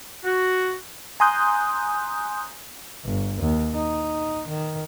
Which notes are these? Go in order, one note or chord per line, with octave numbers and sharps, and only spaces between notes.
F#4
G#5 A#5 C6 D#6 F#6 G6
G1
D#2
D#4
D#3